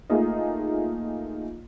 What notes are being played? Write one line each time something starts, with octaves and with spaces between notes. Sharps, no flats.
A3 A#3 D#4 F4 G#4 D#5